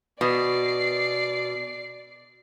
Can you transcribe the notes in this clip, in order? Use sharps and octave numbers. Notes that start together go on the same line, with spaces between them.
B2 D5 C7